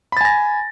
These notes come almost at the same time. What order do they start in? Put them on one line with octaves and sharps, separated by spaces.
B5 A6 G#5 A#6